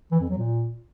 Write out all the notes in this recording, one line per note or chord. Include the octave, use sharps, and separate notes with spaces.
E3
F2
F#3
A#2